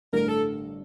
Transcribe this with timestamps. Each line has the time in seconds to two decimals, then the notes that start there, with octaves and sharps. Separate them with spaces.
0.12 A1 G2 D3 A3 D4 A#4
0.28 A4